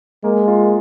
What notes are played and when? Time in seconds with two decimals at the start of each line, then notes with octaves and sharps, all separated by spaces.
0.24 G#3 A#3
0.48 F4